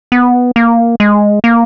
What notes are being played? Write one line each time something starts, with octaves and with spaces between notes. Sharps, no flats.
B3
A#3
G#3
A#3